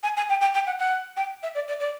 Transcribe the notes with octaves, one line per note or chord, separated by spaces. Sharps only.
G#5
G#5
G5
G5
G5
F#5
F#5
G5
E5
D5
D5
D5